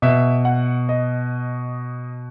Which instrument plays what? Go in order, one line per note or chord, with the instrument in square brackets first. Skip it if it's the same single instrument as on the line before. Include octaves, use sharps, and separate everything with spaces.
[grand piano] B2 E5
F#5
D#5